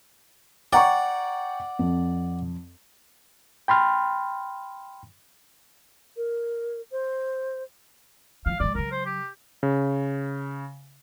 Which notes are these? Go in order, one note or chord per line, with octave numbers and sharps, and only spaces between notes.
D5 F#5 G5 A#5 C#6
F2
G5 B5 C6 F6
A#4
C5
E3 F3 F5
F3 G#3 D5
C#3 F#3 A#4
C5
G4
C#3